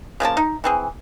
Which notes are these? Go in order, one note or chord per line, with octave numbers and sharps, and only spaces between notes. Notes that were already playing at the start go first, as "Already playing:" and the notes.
C#3 F3 A#3 A5
D#4
E3 C4 G#4